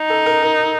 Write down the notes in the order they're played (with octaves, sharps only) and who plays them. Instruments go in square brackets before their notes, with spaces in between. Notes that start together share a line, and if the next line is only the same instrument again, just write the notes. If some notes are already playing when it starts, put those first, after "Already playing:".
Already playing: [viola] D#4
[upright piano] A4
A#4
A#4